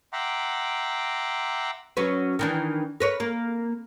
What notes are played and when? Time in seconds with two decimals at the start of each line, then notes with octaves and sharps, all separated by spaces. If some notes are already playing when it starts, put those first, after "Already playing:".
0.13 E5 F#5 G5 A#5 C6 D6
1.97 F#3 C#4 B4
2.39 D#3 E3 D4
3.00 A#4 B4 C#5
3.20 A#3